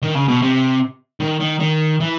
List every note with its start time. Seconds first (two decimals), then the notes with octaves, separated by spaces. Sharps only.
0.03 D#3
0.15 C#3
0.28 B2
0.42 C3
1.20 D#3
1.40 D#3
1.60 D#3
2.01 E3